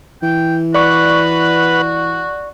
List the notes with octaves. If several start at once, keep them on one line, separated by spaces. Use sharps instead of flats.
E3 G5
F#4 B4 D5 F#5 C#6